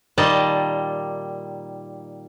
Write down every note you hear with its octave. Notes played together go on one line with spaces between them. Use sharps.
A#2 D#3 G3 D#5 A5